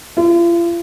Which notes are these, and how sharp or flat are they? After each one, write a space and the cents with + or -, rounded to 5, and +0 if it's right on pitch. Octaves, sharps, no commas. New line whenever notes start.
F4 -40